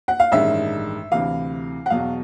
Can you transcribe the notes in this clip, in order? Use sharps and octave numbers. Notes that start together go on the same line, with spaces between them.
F#5
F5
A1 G2 D#3 G#3 E5
D2 C3 E3 F5
F#5
E2 B2 F#3 F5